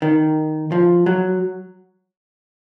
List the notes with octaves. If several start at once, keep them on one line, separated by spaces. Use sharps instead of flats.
D#3
F3
F#3